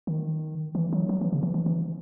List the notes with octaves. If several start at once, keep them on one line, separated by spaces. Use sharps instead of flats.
D#3
E3
F#3
F#3
E3
C#3
E3
E3
E3